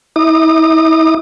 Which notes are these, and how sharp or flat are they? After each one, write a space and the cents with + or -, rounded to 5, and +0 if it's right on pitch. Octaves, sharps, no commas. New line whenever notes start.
E4 -40 D#6 -35